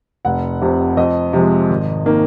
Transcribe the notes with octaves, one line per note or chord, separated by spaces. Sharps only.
F1 F#5
F2 C3
F2 D#5
C3 F3 G#3
G#1
D#3 A#3